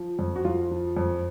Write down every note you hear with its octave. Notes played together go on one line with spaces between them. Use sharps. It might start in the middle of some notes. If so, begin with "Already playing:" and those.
Already playing: F3
F2
F#4
F2 F4
F3
F2